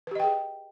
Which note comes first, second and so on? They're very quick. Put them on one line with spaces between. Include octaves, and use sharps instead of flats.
B4 G4 D#5 G5 G#4